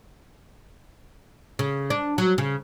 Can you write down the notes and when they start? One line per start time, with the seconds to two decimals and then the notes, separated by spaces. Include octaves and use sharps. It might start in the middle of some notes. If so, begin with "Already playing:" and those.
1.59 C#3
1.90 D4
2.18 F#3
2.38 C#3